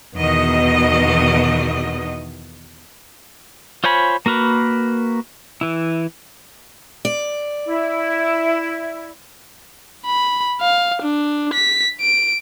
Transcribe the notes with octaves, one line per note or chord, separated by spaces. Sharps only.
E2 B2 D#3 D#5
F4 C5 C#5 G#5 B5
A#3 F#4 A#4 B4
E3 E4
D5
E4
B5
F5
D4
B6
D7